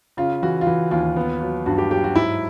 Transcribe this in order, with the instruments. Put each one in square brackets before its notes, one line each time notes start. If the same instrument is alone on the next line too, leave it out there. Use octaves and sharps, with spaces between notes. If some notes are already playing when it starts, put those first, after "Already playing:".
[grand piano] C#3 F4
E3 F#4
F4
E3 F#4
D#2 F4
B3
F#3
G2 F#4
G4
F#3 G4
F#4
G#2 E4